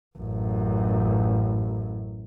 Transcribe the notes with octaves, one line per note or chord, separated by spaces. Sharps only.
A1 F#2